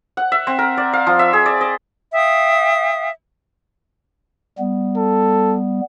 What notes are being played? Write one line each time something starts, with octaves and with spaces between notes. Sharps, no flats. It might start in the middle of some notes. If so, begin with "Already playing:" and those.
F#5
E5
C4
A#4
D5
F5
F3
E5
G#4
D5
D#5
E5 F5 G5 D#6
G3 B3
A4